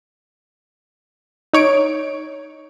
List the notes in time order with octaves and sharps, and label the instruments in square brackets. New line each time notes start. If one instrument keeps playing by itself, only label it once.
[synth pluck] D#4 C#5 D7